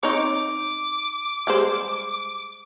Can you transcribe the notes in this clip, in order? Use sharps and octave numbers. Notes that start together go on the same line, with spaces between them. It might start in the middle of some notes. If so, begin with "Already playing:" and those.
C4 D#4 C#5 D6
G3 G#3 C5